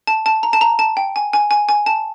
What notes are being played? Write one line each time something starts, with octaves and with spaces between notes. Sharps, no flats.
A5
A5
A#5
A5
A#5
A5
G5
G#5
G#5
G#5
G#5
A5